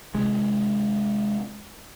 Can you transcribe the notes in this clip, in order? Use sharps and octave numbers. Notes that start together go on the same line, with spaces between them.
C3 G#3